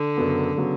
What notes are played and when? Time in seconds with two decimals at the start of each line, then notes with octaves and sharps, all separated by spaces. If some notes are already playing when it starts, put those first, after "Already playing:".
Already playing: D3
0.17 F#2 C#3 F#3 B3
0.57 C#3 F#3 B3